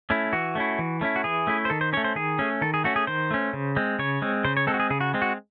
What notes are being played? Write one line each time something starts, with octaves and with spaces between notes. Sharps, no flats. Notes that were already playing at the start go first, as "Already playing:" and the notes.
A3 C#4 E4
E3 F#4
A3 C#4 E4
E3
A3 C#4 E4
F#4
E3 G#4
A3 C#4 E4
C5
D#3 A4
C5
A3 C#4 C#5
C5
D#3 G#4
A3 C#4
D#3 A4
G#4
A3 C#4 F#4
G#4
D#3 C5
A3 C#4
C#3
G#3 C4
C#3 C#5
G#3 C4
C#3 C5
C#5
G#3 C4 A4
F#4
G#4
C#3 G#4
F#4
G#3 C4
F#4